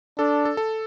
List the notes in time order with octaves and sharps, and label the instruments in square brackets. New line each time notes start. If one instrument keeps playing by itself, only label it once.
[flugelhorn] D4 [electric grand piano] A4
[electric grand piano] A4
A4